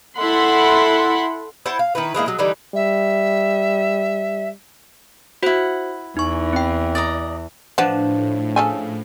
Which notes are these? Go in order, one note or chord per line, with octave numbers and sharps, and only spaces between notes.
E4 A4 F#5 B5 C6
E4 C5 F#5 A5
F5
D#3 E4 B4
E3 G#3 A#3 E4
F#3 G#3
D3 E3 G3 D#4
G3 E5
E4 F#4 C5 F#5
E2 D#4 C#6
C4 G5
D5 D#5 A#5 A6
A2 F3 D4 B4 F#5
C#3 A4 G#5